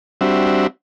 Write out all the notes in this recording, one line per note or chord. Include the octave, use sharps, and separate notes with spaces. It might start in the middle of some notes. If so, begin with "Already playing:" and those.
G3 C4 D4 F#4 E5